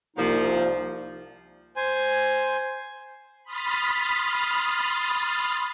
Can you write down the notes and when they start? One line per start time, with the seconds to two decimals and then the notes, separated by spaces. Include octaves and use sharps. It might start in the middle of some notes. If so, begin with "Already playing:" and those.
0.17 C2 F3 A#3 D#4
1.76 C5 G#5
3.44 B5 C6 D#6 F6 A6 B6